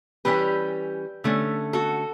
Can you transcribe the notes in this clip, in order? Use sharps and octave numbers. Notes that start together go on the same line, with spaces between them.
E3 G3 C#4 G4 B4
D3 A3 C#4
F#4 A4